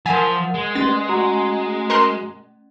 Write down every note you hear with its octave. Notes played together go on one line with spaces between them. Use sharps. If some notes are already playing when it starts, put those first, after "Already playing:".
F3 A#4 C5 F#5 G#5
G#3
A3 C#4 A6
F#4 A#5
A#4 C6 F#6